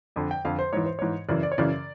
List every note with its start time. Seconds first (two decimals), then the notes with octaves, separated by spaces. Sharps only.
0.16 F2 D3
0.31 G5
0.45 F2 D3 F5
0.59 C5
0.73 G#2 E3 C#5
0.86 C5
0.99 G#2 E3 C#5
1.29 F#2 C#3 E3 D5
1.43 D5
1.52 C#5
1.58 F#2 C#3 E3 D5